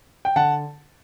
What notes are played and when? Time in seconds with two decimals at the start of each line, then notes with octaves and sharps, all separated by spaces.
0.25 G5
0.36 D3 F#5 A5